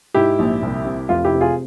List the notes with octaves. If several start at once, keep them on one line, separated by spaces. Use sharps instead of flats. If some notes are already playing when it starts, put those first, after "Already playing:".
G#2 E4 G4
A#1
C2
C3
F1 F4
E4 G4
C3
F4 G#4